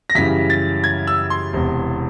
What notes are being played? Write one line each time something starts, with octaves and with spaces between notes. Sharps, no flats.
A#6
F#2 C#3 E3 G3 B6
A6
G#6
E6
C6
E1 E2 C3